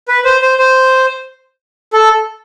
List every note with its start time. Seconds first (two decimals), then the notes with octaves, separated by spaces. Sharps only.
0.08 B4
0.25 C5
0.42 C5
0.59 C5
1.93 A4